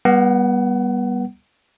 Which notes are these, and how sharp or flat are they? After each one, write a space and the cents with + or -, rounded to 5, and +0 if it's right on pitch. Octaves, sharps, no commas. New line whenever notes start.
G3 +0 B3 -30 F#5 +25